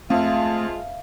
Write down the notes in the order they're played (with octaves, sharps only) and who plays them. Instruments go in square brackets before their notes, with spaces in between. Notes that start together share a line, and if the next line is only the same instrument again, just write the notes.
[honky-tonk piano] F2 [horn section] G#3 F4 [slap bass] A3 [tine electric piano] E5 F5